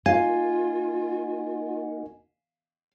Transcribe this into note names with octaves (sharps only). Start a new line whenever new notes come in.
A#3 D#4 F4 F#4 F5 G#5